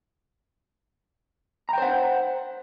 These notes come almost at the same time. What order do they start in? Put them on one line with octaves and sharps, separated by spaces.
A#5 G5 C5 F#5